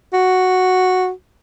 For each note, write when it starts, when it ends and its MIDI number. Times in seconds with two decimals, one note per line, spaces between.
0.13 1.10 66